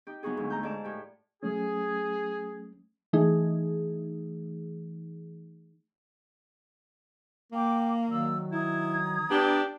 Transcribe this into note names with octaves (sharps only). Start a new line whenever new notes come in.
D#4 G4
F#3 B3 D#4 F4 F#4 G#4
D2 G#2
A3 A#5 G6
G#2 D5 A5
A2 G4
F#3 A3 C#4 G#4
E3 A3 D#4 G#4
A#3 G5 D6
D#3 F#3 D5 E6
E4 A#5 D#6 G#6
B3 D4 G4